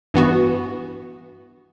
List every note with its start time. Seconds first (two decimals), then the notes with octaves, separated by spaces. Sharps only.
0.14 G2 E3 B3 F#4